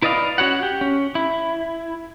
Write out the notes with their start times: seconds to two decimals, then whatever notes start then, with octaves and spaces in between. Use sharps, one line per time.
0.02 E4 B4 D5 D#5 F5
0.38 C#4 F#4 C#5 F#5
0.63 G4
0.81 C#4
1.15 E4